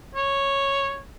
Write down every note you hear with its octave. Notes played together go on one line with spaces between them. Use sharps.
C#5